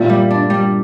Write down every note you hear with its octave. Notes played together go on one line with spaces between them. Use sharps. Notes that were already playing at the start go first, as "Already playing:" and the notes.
Already playing: G2 A#2 E3
G3
D4
G3